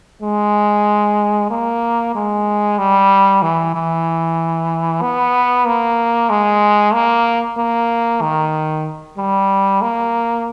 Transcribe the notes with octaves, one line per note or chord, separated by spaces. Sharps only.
G#3
A#3
G#3
G3
E3
E3
B3
A#3
G#3
A#3
A#3
D#3
G3
A#3